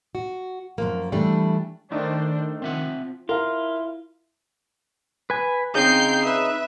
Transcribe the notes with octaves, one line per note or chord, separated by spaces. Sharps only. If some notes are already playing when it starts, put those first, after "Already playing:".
F#4
F#2 F3 A#3
E3 G3 A3 D4 E4
D#3 A3 D4 C5
F3 C4 E5 F#5
E4 F4 A#4 F5
B4 G#5
C#3 C4 D#4 G5 G6 C7
B4 E5